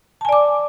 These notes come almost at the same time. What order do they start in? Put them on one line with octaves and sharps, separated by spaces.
A5 G#5 D5 D6